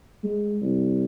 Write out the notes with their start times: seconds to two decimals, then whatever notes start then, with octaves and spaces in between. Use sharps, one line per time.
0.23 G#3
0.61 C2